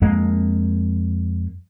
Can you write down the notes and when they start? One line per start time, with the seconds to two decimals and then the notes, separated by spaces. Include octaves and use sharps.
0.02 F2 G#3 A#3